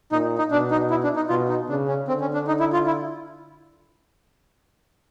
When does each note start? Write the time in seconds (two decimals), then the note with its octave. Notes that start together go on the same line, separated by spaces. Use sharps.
0.12 A#2 D#4
0.38 D#4
0.51 B2 D4
0.71 D#4
0.90 E4
1.04 D4
1.16 D#4
1.29 B2 F4
1.49 D#4
1.69 C#3 D4
1.88 C#4
2.08 D3 C4
2.21 C#4
2.34 D4
2.47 D#4
2.60 E4
2.73 F4
2.87 E4